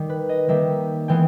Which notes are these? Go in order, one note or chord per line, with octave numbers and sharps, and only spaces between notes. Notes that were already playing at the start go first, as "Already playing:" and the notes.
Already playing: D#3 G3
B4
D#5
D#3 G3 A#3 E5
E3 G#3 B3 G5